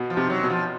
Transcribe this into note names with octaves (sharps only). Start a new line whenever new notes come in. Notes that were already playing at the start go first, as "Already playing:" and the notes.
Already playing: B2
F3
C3
F#3
B2
F3